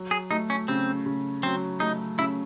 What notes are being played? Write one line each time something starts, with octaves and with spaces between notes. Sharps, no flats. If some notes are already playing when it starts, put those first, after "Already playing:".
Already playing: F#3
G#4
A3 D#4
C#4
C#3 C4
C#3
F#3 C4
A3 D#4
C#3 E4